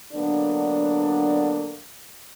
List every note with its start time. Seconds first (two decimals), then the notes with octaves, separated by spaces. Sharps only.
0.13 D3 F#3 A#3 B3 D4